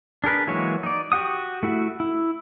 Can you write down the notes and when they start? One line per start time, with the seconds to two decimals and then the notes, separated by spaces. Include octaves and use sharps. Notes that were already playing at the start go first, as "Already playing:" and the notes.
0.24 D4 G#4 A#4 B4
0.47 E3 F#3 G#3 A#3 C#5
0.83 D#4 D5
1.12 F#4 G4 F#5 D#6
1.63 A3 E4 F#4
2.00 E4